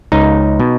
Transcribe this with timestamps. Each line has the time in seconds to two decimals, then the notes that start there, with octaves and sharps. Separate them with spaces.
0.12 C#2 D#4
0.60 B2